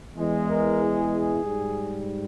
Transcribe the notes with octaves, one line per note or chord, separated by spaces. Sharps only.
E2 E3 G#3
A#4
G#4
G#2 G3